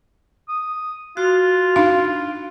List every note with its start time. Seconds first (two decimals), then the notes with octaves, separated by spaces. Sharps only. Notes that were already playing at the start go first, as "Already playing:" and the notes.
0.49 D#6
1.17 F4 F#4
1.76 D4 D#4 F5